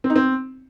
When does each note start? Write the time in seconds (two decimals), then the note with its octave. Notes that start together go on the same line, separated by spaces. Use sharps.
0.04 C4
0.10 D#4
0.16 C4